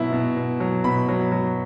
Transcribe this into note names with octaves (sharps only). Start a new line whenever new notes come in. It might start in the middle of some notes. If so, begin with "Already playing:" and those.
Already playing: B2 F#3 E4
B2
B2
F#3
B2 B5
F#3
F#3